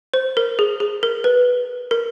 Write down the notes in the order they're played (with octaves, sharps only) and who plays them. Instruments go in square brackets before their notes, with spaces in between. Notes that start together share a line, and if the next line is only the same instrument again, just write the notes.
[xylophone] C5
A#4
G#4
G#4
A#4
B4
A#4